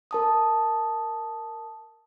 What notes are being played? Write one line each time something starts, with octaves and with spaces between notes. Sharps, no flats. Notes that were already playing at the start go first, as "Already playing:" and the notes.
A#4 A5 D#6